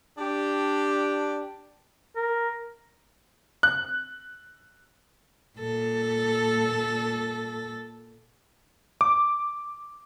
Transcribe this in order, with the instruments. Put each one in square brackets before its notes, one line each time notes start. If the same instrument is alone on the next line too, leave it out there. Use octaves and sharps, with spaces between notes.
[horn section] D4 G4
[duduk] A#4
[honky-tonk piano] F#6
[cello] A#2 A4
[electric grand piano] D6